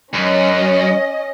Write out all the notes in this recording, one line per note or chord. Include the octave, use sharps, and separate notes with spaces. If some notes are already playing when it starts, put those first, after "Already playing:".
F#2 C#4 D#5